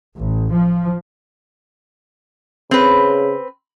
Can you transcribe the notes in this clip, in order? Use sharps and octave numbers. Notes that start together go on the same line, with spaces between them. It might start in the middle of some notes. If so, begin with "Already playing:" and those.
A1
F3
C#3 C4 B4